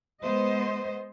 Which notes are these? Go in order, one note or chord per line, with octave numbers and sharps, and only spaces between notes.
G#3 B3 C5 D#5